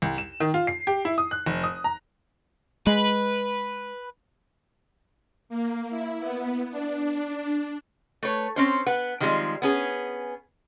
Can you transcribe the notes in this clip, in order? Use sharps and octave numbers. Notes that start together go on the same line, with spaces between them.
C2
E7
D#3
F4
C7
G4
E4
D#6
F#6
F1
D#6
A#5
G#3 B4
A#3
E4
B3
D4
A3 B4 C#5
C4 C#4 C5
B3 B4 F#5
D#3 F3 G3 G#3 C4
B3 C#4 G#4